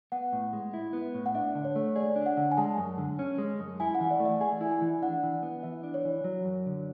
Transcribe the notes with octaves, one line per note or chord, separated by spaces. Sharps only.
B3 F#5
A2
G#3
E4
B3
A2
F#5
D4 E5
D3
C#5
A3
G#4 D5
D4
F#5
D3
G#5
G#3 A5
F#2
D3
C#4
G#3
F#2
E4 G#5
F#5
E3
D5
A3
E5
G#4 G#5
E4
G#5
E3
D4 F#5
E3
B3
E3 E5
D4
C#5
E3
F#3
F#2
D3